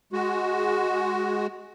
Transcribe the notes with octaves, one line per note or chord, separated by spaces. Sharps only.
G#3 F#4